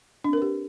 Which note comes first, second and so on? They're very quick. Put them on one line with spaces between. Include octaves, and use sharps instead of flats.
D4 C4 A#4 B4 G4